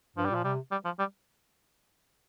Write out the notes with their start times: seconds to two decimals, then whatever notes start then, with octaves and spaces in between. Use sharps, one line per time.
0.16 G2 F3
0.26 G3
0.30 A#2 F3
0.44 C3 G3
0.71 G3
0.85 F3
0.99 G3